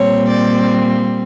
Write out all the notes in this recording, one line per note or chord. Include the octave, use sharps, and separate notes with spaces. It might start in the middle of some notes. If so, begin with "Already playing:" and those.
Already playing: A#2 G3 C4 C#5
D5